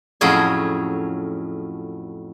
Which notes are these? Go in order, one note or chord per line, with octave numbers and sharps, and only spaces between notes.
F2 A2 F#3 C#4 G#4 C6